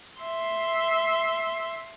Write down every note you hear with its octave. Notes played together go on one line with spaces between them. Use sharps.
E5 C6